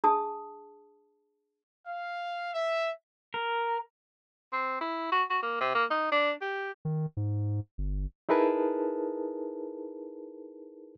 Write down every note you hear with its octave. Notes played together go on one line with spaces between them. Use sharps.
D4 G#4 A5 D#6
F5
E5
A#4
C4
E4
F#4
F#4
A#3
C3
A#3
D#4
D4
G4
D#3
G#2
G1
D#4 E4 G#4 A#4 B4 A5